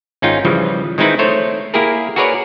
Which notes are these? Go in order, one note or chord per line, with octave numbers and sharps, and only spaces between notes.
G#1 C#4 D#4 F4 G5
C#3 E3 F3 G3
D#3 G#3 C4 D#4 E4 B4
A3 C5 C#5
A#3 E4 G4 G#4 A#4
F#4 G#4 A#4 B4 C#5 D5